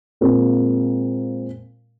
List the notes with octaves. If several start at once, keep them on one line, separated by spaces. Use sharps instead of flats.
A#2 G#3 C4 F4 A#4